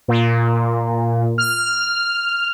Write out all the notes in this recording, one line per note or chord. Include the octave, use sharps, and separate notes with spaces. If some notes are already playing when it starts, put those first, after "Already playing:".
A#2
F6